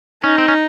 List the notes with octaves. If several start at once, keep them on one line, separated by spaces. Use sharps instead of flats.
C#4 D#4
C4
C#4